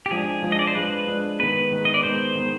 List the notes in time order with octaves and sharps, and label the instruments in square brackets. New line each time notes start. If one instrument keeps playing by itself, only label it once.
[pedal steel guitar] G4
[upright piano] F3 G#3 D4 [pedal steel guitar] G#4
[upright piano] F3 G#3 D4
[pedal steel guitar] D#5
D5
C5
[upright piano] F3 G#3 D4 [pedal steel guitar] B4
[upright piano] F3 G#3 D4
[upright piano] D#3 G#3 B3 [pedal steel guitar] B4
[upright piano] D#3 G#3 B3
[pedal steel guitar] D#5
D5
[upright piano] D#3 G#3 B3 [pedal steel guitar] C5
[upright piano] D#3 G#3 B3